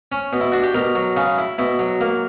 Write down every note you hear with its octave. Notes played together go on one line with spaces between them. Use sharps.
C#4
B2
E4
D4 F#4
G4
B2 A#4
F#3
C#3
E4
B2 E4
F#3
A#3